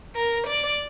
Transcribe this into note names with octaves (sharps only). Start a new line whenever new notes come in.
A#4
D5